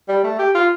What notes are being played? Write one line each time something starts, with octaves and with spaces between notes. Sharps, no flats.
G3
A3
G4
F4